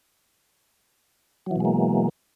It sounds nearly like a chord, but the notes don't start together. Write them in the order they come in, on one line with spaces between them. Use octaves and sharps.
F#3 E3 B2 G#3 A#3